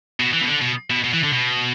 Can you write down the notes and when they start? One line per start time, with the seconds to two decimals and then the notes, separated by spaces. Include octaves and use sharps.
0.20 B2
0.34 E3
0.41 B2
0.48 D3
0.62 B2
0.90 B2
1.04 B2
1.13 E3
1.23 D3
1.32 B2